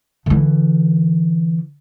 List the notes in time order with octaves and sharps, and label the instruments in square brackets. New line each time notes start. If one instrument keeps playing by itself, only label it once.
[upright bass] D3 E3